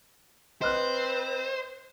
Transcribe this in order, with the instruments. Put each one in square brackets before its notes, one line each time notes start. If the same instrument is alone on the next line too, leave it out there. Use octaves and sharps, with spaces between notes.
[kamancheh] C4 B4 [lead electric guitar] C5 [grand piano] D#5 F6 F#6